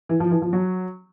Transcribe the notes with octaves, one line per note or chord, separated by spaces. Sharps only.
E3
F3
E3
F3
F#3